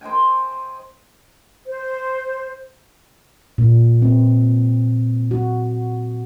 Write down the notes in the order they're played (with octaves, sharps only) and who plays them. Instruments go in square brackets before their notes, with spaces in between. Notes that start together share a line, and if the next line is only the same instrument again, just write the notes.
[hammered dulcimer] C5 D#5 G5 G#5
[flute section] C5
[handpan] A#2
C4
F#4